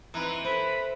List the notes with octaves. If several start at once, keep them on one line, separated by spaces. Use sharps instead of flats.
E3 C4 D#4 B4 A#5
A4 B4 C5 B5